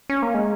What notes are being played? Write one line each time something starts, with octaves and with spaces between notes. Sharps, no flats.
C#4
A#3
G#3